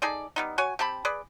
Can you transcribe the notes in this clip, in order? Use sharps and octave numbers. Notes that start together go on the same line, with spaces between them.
D#4 G#4 A4 D5
G3 B3 D#4
F#4 C#5 G#5
C4 G4 A5 B5
G#4 B4 D5